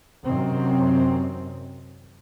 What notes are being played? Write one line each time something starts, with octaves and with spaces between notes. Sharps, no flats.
F#2 C3 D#3 C4